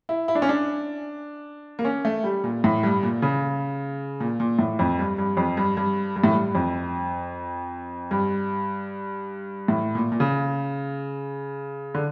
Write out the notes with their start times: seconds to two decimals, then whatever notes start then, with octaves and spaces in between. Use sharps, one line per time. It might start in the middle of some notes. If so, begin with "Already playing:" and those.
0.09 E4
0.28 E4
0.35 D4
0.42 C#4
0.49 D4
1.79 A#3
1.85 C#4
2.05 A3
2.24 G3
2.44 A#2
2.64 A2
2.83 G2
3.03 A#2
3.22 C#3
4.20 A#2
4.40 A#2
4.59 A2
4.79 F2
4.99 G2
5.18 G2
5.37 F2
5.57 G2
5.77 G2
6.16 G2
6.24 A2
6.31 G2
6.55 F2
8.11 G2
9.68 A2
9.95 A#2
10.12 A#2
10.20 C#3
11.95 D3